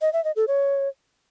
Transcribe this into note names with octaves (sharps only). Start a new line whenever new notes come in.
D#5
E5
D#5
A4
C#5